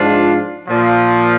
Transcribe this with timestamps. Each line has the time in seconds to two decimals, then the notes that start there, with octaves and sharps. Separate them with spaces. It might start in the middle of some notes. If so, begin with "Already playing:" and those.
Already playing: G#2 F3 D4 F4
0.68 A#2 F3